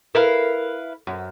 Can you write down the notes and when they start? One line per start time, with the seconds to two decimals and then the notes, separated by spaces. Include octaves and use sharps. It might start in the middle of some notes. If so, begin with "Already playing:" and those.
0.15 E4 A#4 B4 F5
1.07 F#2